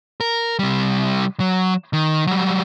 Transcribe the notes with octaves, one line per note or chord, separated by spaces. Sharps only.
A#4
C3 G3
F#3
D#3
F#3 G3